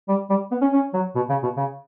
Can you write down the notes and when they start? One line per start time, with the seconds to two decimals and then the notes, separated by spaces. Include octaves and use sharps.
0.09 G3
0.30 G3
0.52 B3
0.62 C#4
0.73 C#4
0.94 F#3
1.16 B2
1.30 C#3
1.43 B2
1.57 C#3